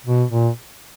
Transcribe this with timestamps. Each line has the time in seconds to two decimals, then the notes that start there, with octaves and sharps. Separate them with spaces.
0.06 B2
0.31 A#2